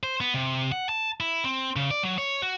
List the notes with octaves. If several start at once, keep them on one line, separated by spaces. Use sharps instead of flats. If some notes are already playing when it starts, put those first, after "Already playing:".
C5
B3
C3
F#5
A5
E4
C4
C#3
D5
F#3
C#5
F#4